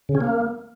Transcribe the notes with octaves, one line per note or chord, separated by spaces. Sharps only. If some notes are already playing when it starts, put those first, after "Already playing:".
C#3
C#4
A#3